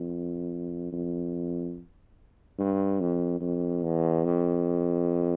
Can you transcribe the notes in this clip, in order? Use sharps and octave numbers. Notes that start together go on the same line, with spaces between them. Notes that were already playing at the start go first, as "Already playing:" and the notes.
Already playing: F2
F2
G2
F2
F2
E2
F2